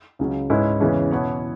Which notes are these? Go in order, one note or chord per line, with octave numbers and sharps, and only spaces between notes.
C#2 C#3 F#3
G#2 G#3 C#4 E4 B4
E2 C#3 E3 G#3 C#4
B2 B3 E4 C#5